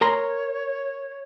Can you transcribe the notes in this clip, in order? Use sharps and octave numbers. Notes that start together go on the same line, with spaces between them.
A#4 C#5 A#5 C6